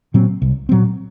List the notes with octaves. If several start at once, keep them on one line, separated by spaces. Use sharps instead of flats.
A#2 F#3 C4
C2
A#2 F#3 C4